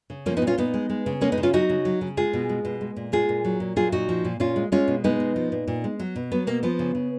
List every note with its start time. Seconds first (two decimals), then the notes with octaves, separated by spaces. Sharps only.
0.10 C#3
0.26 F3 A#3 C#4
0.37 B3 D#4
0.42 A#2
0.47 C#4 F4
0.58 A#2 B3 D#4
0.74 G#3
0.89 G#3
1.06 C#3
1.21 G#3 A#3 C#4
1.32 B3 D#4
1.38 C#3
1.43 C#4 F4
1.53 F#3 D#4 F#4
1.70 C#3
1.85 F#3
2.01 C#3
2.17 G#3 F4 G#4
2.33 B2
2.49 G#3
2.65 B2
2.81 G#3
2.96 A#2
3.12 G#3 F4 G#4
3.29 A#2
3.45 F#3
3.60 A#2
3.76 F#3 F4 G#4
3.92 A#2 D#4 F#4
4.09 F3
4.25 A#2
4.40 A#2 C#4 F4
4.56 G#3
4.72 G#3 C#4 F4
4.88 B2
5.04 G#3 B3 D#4
5.20 B2
5.36 F3
5.52 A#2
5.67 A#2
5.84 G#3
6.00 F#3
6.16 B2
6.32 F#3 B3
6.47 B2 A#3
6.63 F3 B3
6.79 C#3
6.95 C#3